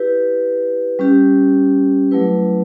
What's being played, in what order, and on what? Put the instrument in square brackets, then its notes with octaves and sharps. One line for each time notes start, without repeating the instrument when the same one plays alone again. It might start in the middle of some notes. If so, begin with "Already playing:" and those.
Already playing: [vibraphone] E4 G4 B4
G3 C#4 G4
F#3 A3 E4 B4